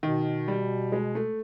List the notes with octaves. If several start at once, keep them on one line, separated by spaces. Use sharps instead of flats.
B2 D#3
G3
G#3
A3